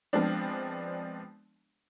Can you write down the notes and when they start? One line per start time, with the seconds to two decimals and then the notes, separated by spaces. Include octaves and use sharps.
0.13 F3 G#3 B3 C4 D4